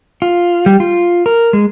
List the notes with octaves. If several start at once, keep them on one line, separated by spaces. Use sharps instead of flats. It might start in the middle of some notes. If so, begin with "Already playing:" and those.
F4
G3
F4
A#4
G#3